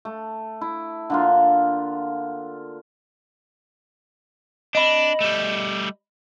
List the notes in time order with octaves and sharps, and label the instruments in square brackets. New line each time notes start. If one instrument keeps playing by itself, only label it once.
[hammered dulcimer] A3
E4
D3 A#3 F4
[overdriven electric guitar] D4 [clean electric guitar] D#5 B5
[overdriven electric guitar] G3 A3